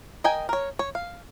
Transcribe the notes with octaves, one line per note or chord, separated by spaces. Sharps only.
A#4 D#5 G5 G#5
A#4 C#5
C#5
F5